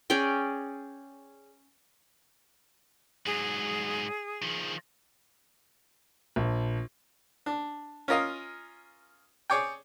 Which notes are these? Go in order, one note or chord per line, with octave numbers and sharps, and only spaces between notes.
C#4 G#4 D5 G5
G#2 F#3 G#4
D#3 F3
A#1
D4
C#4 F4 A#4 D#5 F5
G#4 C#5 D5 G5